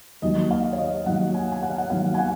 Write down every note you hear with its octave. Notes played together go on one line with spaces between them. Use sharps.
D#2 D#3 F#3 D#5
F5
C#5
D#5
D#2 D#3 F#3 F#5
G#5
G#5
F#5
F5
F#5
D#2 D#3 F#3 F5
G#5
F#5